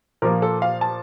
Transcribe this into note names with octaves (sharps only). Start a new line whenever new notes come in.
A#2 F3 A#3 A#4
A4
F5
A5